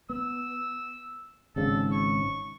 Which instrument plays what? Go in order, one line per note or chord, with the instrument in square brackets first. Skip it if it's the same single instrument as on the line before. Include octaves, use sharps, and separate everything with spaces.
[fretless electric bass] B3 [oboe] E6
[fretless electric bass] G#1 G#2 C#3 [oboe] A4
[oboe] C#6